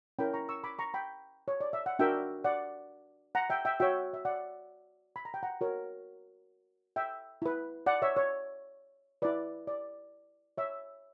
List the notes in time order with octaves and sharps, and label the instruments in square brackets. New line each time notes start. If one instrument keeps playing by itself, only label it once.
[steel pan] C#4 E4 A#4 G5 B5
A#5 C#6
C#6 E6
B5 D6
A#5 C#6
G5 B5
C#5
D5
E5
F#5
D4 F#4 A#4 E5 G5
D5 F#5
F#5 A#5
E5 G5
E5 G5
F#4 C#5 E5 G5
E5
D5 F#5
B5
A#5
G5
F#5 A#5
F#4 A#4 C#5
E5 G5
E4 B4
D5 F#5
C#5 E5
C#5
E4 B4 D5
D5
C#5 E5